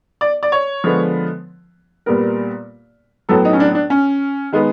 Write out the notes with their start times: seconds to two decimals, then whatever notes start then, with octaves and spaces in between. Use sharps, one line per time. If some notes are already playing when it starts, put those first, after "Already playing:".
0.21 D5
0.43 D5
0.52 C#5
0.84 D3 F3 G#3 B3
2.06 A#2 G3 B3 A#4
3.29 A2 F#3 B3 A4
3.45 D#4
3.53 C#4
3.60 D4
3.75 D4
3.90 C#4
4.52 D#3 G#3 B3